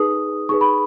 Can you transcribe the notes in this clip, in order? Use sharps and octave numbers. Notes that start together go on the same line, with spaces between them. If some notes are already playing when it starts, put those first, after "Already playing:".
Already playing: D#4 G#4 B4 D#6
D#4 G#4 B4 C#6
B5